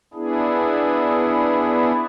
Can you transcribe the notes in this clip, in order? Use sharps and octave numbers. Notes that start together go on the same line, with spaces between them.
B3 D4 E4 G#4